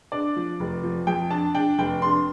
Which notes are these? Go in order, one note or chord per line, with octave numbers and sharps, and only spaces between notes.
D4 D5
F3
F1
F3
F2 G5
D4 A5
D4 G5
F1 G5
D4 C6